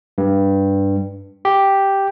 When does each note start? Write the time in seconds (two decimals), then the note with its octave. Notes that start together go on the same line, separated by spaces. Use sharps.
0.18 G2
1.45 G4